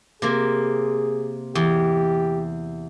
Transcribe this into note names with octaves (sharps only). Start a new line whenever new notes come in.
C3 A#3 G#4
E2 G4